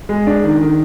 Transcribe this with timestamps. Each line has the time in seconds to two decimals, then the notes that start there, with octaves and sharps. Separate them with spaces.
0.09 G#3
0.27 D4
0.44 D#3
0.61 D#3